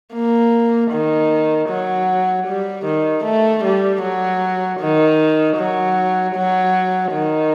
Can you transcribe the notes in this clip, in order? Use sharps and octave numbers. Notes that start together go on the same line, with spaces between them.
A#3
D#3
F#3
G3
D#3
A3
G3
F#3
D#3
F#3
F#3
D#3